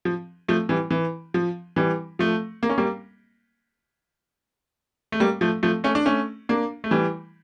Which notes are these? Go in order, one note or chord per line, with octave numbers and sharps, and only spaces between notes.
F3
F3 A3
E3 G3
E3
F3
E3 G3
F3 A3
A#3
C#4
G3 A#3
A3
G3 A#3
F3 A3
F3 A3
A3 C#4
D4
A3 C#4
A#3 D4
A3
E3 G3